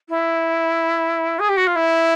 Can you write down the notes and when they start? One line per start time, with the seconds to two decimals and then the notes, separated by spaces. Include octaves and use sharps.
0.09 E4
1.39 G#4
1.49 G4
1.57 F#4
1.67 F4
1.75 E4